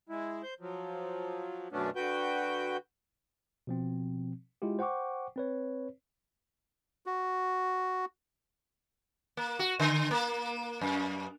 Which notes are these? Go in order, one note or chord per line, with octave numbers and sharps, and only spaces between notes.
G#3 E4
C5 G6
F3 F#3
F#2 B2 A3 B3 C#4 D4
D3 F#4 B4 G5 G6
B2 F3 C4
G#3 E4 F4 G4
C5 F#5 G5 C#6 D6
C4 B4 C#5
F#4
A#3
F#4
D3
A#3
F#2